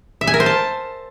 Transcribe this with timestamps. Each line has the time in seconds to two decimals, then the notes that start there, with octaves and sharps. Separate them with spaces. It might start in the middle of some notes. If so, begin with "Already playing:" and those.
0.21 E5
0.27 G#5
0.34 A#4
0.40 C5
0.46 A5